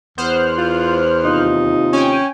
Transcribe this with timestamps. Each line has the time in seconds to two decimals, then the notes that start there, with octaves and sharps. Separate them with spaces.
0.18 E2 B3 C5 F6 F#6
0.58 F4
1.24 D#2 C3 D#4 F4
1.93 C#4 G5 G#5